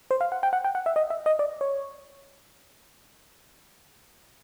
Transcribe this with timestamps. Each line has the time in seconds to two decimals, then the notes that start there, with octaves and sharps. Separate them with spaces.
0.11 C5
0.21 F5
0.32 F#5
0.43 G5
0.53 F#5
0.64 G5
0.75 F#5
0.86 E5
0.96 D#5
1.10 E5
1.26 D#5
1.39 D5
1.61 C#5